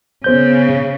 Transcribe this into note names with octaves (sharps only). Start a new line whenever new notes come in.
C#3 B3 C5 G6